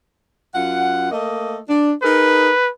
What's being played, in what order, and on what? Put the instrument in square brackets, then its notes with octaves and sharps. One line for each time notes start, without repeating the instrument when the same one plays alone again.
[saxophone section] F#2 F4 F#5
A3 A#3 D#5
D4
[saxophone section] D#4 G#4 A#4 [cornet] B4